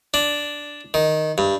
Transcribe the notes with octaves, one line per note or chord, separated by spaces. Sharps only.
D4
D#3
G2